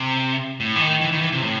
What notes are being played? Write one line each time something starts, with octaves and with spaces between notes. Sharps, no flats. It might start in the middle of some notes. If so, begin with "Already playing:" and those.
Already playing: C3
A2
E3
D#3
E3
D#3
E3
C3
A2